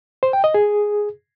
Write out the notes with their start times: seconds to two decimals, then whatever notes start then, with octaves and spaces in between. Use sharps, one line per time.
0.23 C5
0.33 G5
0.44 D#5
0.54 G#4